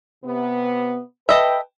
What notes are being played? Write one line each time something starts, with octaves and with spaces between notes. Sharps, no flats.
C3 B3
A4 B4 D#5 E5 G5